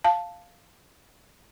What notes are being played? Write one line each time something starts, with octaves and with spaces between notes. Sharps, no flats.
F5 A5